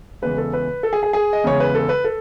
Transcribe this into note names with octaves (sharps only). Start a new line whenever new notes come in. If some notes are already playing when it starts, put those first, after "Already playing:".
E2 C#3 G#3 B4
A4
B4
A4
G#4
G#4
G#4
D#5
E2 C#3 G#3 C#5
B4
A4
B4
A4